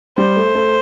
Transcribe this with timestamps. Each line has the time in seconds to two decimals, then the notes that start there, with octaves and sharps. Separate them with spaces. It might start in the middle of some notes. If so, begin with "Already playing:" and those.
0.18 G3 C5
0.36 A3
0.55 A3